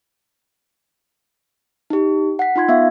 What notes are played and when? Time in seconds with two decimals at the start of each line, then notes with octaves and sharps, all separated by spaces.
1.90 D#4 G4
2.39 F#5 B6
2.56 D#4 F4 C6 G#6
2.68 B3 E5 F5